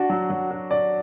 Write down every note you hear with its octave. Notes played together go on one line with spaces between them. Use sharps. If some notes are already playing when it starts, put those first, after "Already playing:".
Already playing: D4 F#4
F#3
F#3
F#4
D5